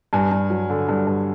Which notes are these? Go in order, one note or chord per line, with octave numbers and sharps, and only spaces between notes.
G2 G#5
G2
F#3
D3
G2
G2